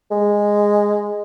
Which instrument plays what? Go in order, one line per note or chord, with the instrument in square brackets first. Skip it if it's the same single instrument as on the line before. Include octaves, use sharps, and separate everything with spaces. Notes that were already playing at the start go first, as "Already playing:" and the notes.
[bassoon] G#3